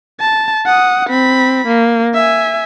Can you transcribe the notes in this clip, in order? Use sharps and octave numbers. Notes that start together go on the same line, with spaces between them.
A5
F#5 D#6
C4 B5
A#3
E5 G#5